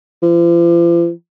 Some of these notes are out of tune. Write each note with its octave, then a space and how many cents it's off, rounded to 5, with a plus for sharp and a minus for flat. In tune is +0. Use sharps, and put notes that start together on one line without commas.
F3 -45